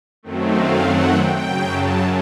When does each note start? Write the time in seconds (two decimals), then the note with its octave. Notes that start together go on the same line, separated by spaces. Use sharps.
0.23 F#2 D#3 F#3 A3 C4
0.53 F5
0.82 F#5
1.11 G5
1.41 F#2 C#3 F#3
1.70 A5